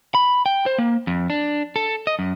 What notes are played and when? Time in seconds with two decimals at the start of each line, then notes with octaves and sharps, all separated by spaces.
0.15 B5
0.46 G5
0.66 C5
0.78 A#3
1.07 F2
1.30 D4
1.76 A4
2.07 D#5
2.19 F#2